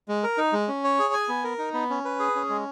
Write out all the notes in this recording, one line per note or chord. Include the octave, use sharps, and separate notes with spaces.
G#3
A#4
D#4
G#3
C#4
C#5
G#4
G#5
B3
A#4
D#4
B3
C#4
B4
G#4
C#4
G#3